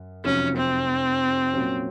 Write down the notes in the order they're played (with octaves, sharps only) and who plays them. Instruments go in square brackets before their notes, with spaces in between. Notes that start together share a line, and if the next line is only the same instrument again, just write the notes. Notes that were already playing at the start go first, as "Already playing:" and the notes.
Already playing: [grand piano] F#2
[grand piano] F1 F2 C3 F#3 [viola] C#4
[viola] C4
[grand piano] A#2 F#3 C#4